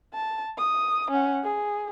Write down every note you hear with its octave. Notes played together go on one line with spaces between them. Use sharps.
A5
D#6
C#4 F#5
G#4